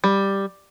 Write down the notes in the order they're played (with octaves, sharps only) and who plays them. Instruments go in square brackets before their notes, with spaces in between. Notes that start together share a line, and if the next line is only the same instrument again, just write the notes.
[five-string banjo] G3